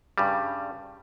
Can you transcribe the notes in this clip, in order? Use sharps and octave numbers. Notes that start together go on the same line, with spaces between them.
G2 C#3 G3